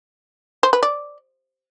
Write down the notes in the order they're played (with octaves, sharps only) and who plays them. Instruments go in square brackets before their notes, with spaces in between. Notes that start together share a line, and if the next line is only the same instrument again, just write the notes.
[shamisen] C5
B4
D5